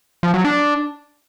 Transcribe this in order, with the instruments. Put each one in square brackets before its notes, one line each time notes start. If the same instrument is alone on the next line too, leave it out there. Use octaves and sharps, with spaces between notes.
[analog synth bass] F3
F#3
D4